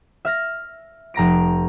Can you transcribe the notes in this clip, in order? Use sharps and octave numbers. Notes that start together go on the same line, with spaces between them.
E5 F6 A#6
F1 A#5 A#6 D7